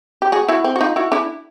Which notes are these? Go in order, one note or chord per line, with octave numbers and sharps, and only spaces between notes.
G4
F#4 G#4
E4 F#4
C4
F#4
D#4 F4
E4 F#4
D4 E4